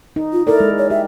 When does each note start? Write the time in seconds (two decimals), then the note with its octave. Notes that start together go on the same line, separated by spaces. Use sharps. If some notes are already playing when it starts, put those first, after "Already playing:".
0.16 D#4
0.33 F4
0.47 E4 A4 A#4 D5
0.60 G#3
0.78 C#5
0.90 G4 E5